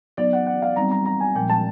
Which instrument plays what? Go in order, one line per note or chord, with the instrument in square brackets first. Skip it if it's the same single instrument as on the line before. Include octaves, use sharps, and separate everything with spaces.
[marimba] F#3 B3 D#4 [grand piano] D5
[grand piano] F#5
F#5
F5
[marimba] G3 C4 D#4 [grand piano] A#5
[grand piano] A#5
A#5
G#5
[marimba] A#2 F3 G#3 [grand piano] G5
[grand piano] A5